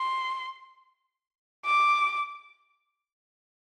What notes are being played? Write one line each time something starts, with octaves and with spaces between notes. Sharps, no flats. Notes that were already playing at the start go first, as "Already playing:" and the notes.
Already playing: C6
D6